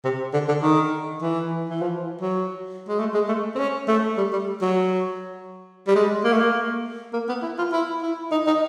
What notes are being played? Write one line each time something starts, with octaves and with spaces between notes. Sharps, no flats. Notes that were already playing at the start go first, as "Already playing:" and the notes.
C3
D3
D3
D#3
E3
E3
F3
F#3
G#3
A3
G#3
A3
C4
C#4
A3
G3
G3
F#3
G3
G#3
A#3
A3
A#3
A#3
B3
E4
F4
E4
E4
D#4
D#4